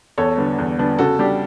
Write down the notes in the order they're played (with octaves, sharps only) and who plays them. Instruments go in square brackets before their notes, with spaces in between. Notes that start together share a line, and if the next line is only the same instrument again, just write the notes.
[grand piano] E2 [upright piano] A4 C#5
[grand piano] D3 G3 B3 D4
E2
D3 G3 B3 D4
[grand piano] C#3 [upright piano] F#4 A4
[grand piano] G3 D4 G4